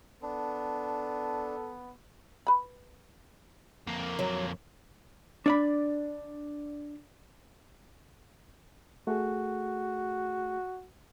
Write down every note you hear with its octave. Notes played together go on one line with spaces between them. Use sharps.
B3 D4 A4
B4 B5
F2 A#3
F#3
D4 D5 B5
A3 F#4 G#4